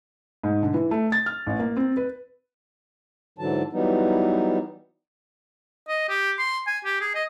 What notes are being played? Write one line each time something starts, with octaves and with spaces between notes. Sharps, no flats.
G#2
D3
E3
A3
A6
F6
A1
A#3
C4
B4
G#2 D3 E3 F#3 A5
E3 F#3 G3 B3 D#4
D#5
G4
C6
G#5
G4
G#4
D#5